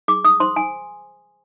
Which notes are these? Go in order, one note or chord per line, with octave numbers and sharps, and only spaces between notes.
G#4 D6
D#6
C5 C6
G#5